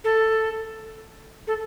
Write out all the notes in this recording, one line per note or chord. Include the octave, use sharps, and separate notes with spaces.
A4
A4